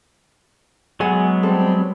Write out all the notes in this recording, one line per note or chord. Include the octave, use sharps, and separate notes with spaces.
F#3 G#3 B3 G#4 F#5 G#5
G3 C4 G#4 A4 A5